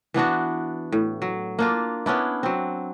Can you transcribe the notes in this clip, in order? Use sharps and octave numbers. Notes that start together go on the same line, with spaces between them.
E3 B3 D4 F#4
A2
F#3
A#3 D4 F4
B3 C#4 D4 E4
F#3 C4